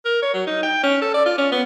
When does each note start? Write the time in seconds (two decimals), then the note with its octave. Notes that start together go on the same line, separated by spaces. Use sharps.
0.05 A#4
0.22 C#5
0.34 F#3
0.47 D#4
0.63 G5
0.83 C#4
1.02 A4
1.14 D5
1.26 F4
1.38 C#4
1.52 B3